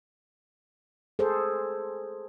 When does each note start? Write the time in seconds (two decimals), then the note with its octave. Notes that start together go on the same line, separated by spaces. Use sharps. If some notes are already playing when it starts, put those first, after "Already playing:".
1.19 G#4 A4 C5